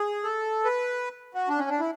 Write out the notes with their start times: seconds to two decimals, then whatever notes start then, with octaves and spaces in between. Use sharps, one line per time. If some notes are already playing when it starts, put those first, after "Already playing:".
Already playing: G#4
0.24 A4
0.65 B4
1.34 F#4
1.49 D4
1.59 C#4
1.70 D4
1.80 E4